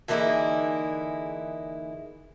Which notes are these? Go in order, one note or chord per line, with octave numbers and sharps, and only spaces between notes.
D3 E3 A#3 D#4 E4 G#4